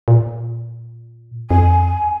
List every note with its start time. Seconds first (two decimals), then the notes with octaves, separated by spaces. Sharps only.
0.08 A#2
1.51 F2 G#5